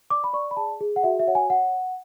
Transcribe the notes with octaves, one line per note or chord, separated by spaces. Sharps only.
D5 D6
B5
D5 C#6
B5
G#4 A5
G#4
F#5
F#4 E5
E5
C#5 F#5
G#5
F#5